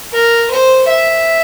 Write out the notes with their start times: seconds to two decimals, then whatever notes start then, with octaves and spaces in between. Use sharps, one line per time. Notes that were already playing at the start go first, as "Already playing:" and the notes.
0.13 A#4
0.51 C5
0.89 E5